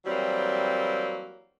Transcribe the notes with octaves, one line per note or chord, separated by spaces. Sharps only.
E3 F#3 G3 A#3 C4